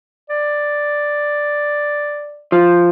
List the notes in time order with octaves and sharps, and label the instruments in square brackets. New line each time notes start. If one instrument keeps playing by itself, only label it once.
[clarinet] D5
[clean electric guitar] F3